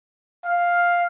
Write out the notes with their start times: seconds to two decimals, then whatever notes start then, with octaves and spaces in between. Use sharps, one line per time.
0.46 F5